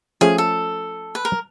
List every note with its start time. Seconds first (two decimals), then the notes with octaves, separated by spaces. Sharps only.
0.21 F3 A3 C#4 G#4
0.38 A4
1.15 B4
1.25 A#4